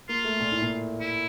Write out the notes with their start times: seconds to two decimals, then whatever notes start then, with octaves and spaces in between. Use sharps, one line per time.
0.09 A#3 F4
0.25 A3
0.40 A#2
0.52 A2
0.62 A#2
1.00 E4